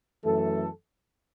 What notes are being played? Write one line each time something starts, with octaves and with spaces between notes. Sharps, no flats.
F#2 E3 A3 A4